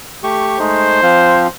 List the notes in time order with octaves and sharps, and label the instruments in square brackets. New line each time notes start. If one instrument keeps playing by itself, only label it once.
[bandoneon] A3 G4 C#6
[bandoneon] G#3 A3 D#4 [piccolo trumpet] C5
[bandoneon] F3 C4 F4